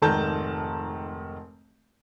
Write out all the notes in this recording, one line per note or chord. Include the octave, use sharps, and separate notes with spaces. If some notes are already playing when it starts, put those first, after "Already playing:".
F1 G#2 D#3 A5 A#5 G6